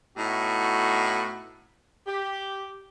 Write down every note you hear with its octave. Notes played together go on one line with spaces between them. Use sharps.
A2 B3 D#4 F#4
G4